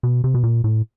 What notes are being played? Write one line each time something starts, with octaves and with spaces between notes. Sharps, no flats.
B2
C3
B2
A#2
A2